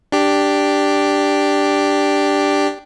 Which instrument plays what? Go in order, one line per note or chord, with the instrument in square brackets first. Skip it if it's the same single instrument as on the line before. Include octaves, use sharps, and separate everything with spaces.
[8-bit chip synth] D4 G4